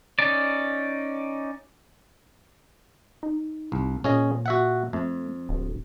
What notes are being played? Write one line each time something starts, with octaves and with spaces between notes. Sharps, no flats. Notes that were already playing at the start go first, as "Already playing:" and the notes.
C#4 D#4 D5
D#4
C2
A#2 C#4 G#4 D#5
F#4 E5 F#5
F2 A3
D1